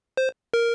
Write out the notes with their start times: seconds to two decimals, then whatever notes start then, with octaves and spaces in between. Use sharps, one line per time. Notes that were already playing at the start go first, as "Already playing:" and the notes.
0.17 C5
0.54 A#4